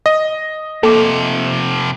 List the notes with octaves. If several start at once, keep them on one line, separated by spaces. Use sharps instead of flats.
D#5
C3 F3 A#3 A4 D6